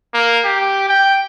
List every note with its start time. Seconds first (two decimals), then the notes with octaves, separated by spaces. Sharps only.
0.14 A#3
0.44 G4
0.89 G5